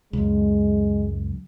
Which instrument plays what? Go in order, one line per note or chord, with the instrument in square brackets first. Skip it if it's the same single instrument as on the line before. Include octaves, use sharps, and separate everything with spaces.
[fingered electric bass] C#2 F#2 [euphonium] G#3